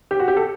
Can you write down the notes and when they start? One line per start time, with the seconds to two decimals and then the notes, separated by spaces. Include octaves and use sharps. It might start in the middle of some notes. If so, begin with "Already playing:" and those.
0.11 G4
0.20 F#4
0.28 G4
0.36 A4